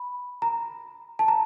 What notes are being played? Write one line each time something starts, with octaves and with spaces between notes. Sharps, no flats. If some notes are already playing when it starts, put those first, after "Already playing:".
Already playing: B5
A#5
A5
A#5